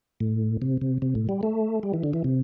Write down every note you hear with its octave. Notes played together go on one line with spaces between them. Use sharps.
A2
C3
C3
C3
A2
G3
A3
G3
E3
D3
E3
C3